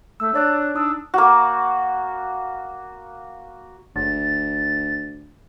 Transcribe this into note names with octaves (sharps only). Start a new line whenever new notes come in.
A3 E6
D4 C#5 D5 F#6
D4 D#4 D#6 E6
A#3 F#4
F#1 D2 A6